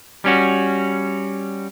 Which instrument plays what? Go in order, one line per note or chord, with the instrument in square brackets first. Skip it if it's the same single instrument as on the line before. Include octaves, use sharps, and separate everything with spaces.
[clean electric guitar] G3 C#4 F#4